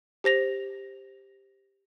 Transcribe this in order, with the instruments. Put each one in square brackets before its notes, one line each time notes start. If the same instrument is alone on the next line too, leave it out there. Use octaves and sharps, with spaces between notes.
[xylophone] G4 C5 A#6 F7